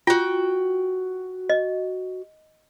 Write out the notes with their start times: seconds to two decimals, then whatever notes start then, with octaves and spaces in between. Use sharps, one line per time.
0.07 F4 F#4 G5
1.50 D#5